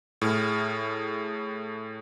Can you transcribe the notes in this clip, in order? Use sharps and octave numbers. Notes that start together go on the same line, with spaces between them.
A2 G#4 F6